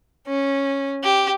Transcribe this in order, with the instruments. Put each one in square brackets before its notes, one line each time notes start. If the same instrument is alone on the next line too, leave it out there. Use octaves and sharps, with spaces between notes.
[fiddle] C#4
G4